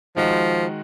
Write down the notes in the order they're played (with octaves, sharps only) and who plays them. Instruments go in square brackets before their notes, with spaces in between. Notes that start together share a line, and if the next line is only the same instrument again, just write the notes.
[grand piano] D#3 G#3 D#4 F#4 [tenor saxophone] F3